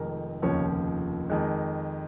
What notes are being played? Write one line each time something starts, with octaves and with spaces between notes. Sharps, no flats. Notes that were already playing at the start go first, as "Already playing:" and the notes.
Already playing: F1 F2 D#3 G#3 A#4
F1 D#2 C#3 F3 C#5
F2 D#3 G#3